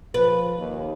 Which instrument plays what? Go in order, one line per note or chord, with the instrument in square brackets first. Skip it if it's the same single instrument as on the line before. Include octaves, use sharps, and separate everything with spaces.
[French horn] F3 [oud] B4
[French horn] D#2